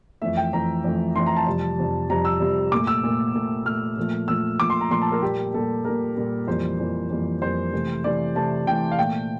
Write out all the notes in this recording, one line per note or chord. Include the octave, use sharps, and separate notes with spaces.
F2 E3 A3 E5
G5
F2 E3 A3 A#5
F2 E3 A3
F2 E3 A3 C6
A#5
A5
F2 C3 G3
F2 C3 G3
F2 C3 G3 A#5
E6
F2 C3 G3
A#2 A3 D6
E6
A#2 A3
A#2 A3
A#2 A3 F6
A#2 F3 A3
A#2 F3 A3 E6
A#2 F3 A3 D6
C6
A#5
A#2 F3 A3 C6
A5
A#4
A#2 G3 A#3 G4
A#2 G3 A#3 A4
A#2 G3 A#3 A#4
A#2 G3 A#3
F2 E3 G3 A#3 C5
F2 E3 G3 A#3
F2 E3 G3 A#3
F2 E3 G3 A#3 C5
C3 E3 A3
C3 E3 A3 D5
C3 E3 A3 A5
C3 E3 A3 G5
F5
A#2 A3 G5